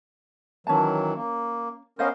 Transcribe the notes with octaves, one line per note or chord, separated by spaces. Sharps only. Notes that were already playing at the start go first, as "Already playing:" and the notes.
D#3 E3 F#3 C#4 A5
A#3
B3 C#4 A#4 C5 D#5 F5